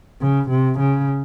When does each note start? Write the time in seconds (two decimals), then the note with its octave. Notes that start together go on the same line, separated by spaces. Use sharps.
0.21 C#3
0.50 C3
0.80 C#3